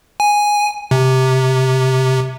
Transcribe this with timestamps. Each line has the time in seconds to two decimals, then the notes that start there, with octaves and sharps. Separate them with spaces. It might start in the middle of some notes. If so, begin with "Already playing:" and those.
0.20 G#5
0.91 C3